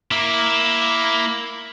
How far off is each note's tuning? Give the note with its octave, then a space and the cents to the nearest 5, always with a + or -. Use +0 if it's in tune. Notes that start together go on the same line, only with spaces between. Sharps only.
A#3 +5 E4 +0